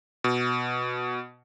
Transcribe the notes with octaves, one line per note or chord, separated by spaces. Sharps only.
B2